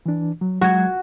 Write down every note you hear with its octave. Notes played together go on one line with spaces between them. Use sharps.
E3 D4
F#3
F#3 G#3 F#4 G#6